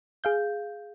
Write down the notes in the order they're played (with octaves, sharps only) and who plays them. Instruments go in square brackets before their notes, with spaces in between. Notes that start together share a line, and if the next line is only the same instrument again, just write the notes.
[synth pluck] G#4 F5 G6